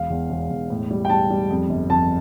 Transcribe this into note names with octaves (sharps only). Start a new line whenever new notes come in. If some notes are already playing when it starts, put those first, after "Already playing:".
Already playing: E1 F5
E2
E1
E1
A2
G3
G5
G3 A5
G3
F2
G1
F2 A5